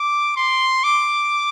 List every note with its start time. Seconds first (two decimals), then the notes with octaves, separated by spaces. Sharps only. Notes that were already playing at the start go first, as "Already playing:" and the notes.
Already playing: D6
0.36 C6
0.84 D6